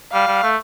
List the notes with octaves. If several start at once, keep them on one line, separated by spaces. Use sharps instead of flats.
G3 F5
G3
A3